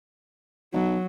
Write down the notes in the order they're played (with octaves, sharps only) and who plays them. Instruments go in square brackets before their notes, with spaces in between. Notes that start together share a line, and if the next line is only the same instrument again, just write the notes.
[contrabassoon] B1 [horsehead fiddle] F#3